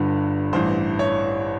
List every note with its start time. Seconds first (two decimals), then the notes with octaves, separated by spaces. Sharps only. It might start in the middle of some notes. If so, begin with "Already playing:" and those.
Already playing: G1 G2 D3 B4
0.53 A1 G2 E3 C5
0.99 C#5